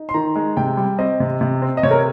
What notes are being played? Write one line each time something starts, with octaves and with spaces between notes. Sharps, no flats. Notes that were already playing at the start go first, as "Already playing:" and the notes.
Already playing: D#4
C6
D#3 A#5
G#3
C3 G5
G3
C4 D#5
C3
C3
C4
D#5
C3 C#5
A#4